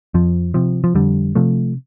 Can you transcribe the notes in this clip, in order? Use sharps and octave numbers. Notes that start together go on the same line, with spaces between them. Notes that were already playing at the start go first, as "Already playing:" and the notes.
F2 F3
C3 F3
F3
F2 D3 G3
C3 F3 A3